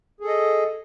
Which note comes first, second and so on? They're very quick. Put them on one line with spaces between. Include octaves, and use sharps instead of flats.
G#4 A4 D#5